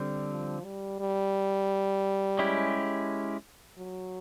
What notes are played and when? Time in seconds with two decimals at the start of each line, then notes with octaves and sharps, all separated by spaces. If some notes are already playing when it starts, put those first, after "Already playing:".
Already playing: D3 G3 C4
0.30 F3
0.64 G3
1.00 G3
2.39 G#3 C#4 E4 G4
3.77 F#3